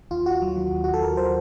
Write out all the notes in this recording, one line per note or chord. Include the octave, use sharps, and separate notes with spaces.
D#2 F4
D#2 F#4
F#3
D#3
D#2
D#2 F#4
A4
F#3 A#4
D#3 C5